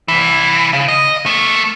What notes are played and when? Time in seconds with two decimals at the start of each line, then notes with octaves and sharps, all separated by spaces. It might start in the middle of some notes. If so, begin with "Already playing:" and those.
0.08 C2 E3
0.73 C#3
0.88 D#5
1.26 A3 A#3